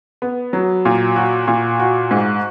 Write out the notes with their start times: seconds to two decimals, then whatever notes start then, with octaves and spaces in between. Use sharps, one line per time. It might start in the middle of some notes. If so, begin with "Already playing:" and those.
0.22 B3
0.53 F#3
0.85 A#2
1.16 F#4
1.48 A#2
1.79 F#4
2.11 G#2